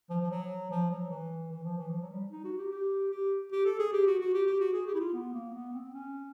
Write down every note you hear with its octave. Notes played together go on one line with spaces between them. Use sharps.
F3
F3
F#3
F3
F#3
E3
E3
F3
E3
F3
F#3
G3
D#4
F#4
G4
G4
G4
G4
A4
G#4
G4
F#4
F#4
G4
G4
F#4
G#4
G4
E4
F4
B3
A#3
B3
C4
C#4